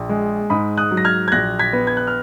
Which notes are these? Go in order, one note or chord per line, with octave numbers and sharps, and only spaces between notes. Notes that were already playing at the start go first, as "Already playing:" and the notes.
Already playing: A#1
G#3
G#2 B5 D#6
D#6 F#6
F#3
A#6
F6 G#6
G#6
A#1 F#6 A#6
G#6 B6
B3
G#6
F#6
F6